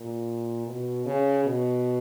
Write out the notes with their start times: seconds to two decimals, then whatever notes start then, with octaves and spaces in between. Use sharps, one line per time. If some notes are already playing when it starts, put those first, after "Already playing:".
Already playing: A#2
0.67 B2
1.06 C#3
1.45 B2